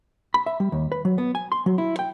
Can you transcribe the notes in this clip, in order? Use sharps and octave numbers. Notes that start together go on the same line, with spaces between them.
B5
E5
G3
D#2
B4
F#3
B3
G#5
C6
F#3
E4
G5